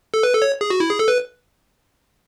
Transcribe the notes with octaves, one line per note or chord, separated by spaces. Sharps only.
A4
B4
A4
C#5
G#4
F#4
E4
G#4
A4
B4